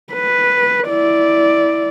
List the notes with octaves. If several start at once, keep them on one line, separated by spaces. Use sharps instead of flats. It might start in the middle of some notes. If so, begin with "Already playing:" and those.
B4
E4 D5